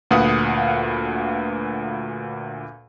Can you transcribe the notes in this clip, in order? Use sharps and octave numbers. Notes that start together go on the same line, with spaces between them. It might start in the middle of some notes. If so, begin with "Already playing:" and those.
D2 A#2 B4 F5 F#5 D#6